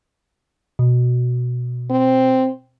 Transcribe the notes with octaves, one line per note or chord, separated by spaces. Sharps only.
B2
C4